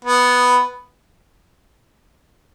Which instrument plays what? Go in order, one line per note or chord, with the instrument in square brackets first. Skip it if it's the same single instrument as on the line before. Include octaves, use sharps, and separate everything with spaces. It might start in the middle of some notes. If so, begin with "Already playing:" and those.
[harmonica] B3